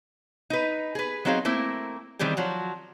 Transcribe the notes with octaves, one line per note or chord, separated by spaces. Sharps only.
D#4 B4
G#4 B4
F#3 C4 D#4 F#4 G#4 F5
A3 A#3 C4 E4
D#3 E3 G3 C4 G#4
F3 F#3 F#4